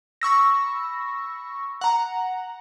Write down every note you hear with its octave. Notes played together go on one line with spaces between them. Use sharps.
B5 C#6 E6 A#6
F#5 A#5